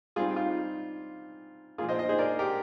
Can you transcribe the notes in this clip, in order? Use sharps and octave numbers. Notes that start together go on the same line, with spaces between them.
G3 C4 D#4 F4 G#4
F4
A#2 F3 A#3 F4 G#4
C5 D#5
C5 D#5
G#4 C5
A#4 D5
G4 A#4